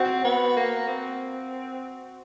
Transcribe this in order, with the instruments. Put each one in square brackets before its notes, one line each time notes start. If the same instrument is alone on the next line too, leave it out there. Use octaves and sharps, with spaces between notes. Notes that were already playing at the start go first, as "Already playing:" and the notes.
Already playing: [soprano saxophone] C4 [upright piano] F#4
[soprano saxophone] B3
A#3
C4